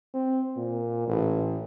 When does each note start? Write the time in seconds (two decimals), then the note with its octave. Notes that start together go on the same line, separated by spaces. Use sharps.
0.14 C4
0.56 A#2
1.07 A1